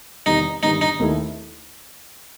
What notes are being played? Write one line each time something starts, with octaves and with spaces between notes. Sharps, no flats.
E2 C3 D#3 G3 D#4
G1 G2 D#3 G3 D#4
D#4
D#2 D#3 A3 E4